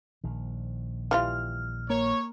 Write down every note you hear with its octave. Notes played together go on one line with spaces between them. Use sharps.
A#1 D#3
E3 G3 F4 F6
A#3 C#5